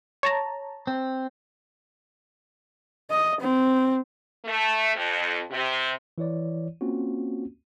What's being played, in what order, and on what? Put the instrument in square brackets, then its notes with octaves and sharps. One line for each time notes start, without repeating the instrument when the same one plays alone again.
[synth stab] C#5 A5 A#5
[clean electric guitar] C4
[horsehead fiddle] D#5
C4
[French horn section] A3
F2
C3
[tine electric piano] E3 E4 C#5 D5
A#3 C4 C#4 F4 F#4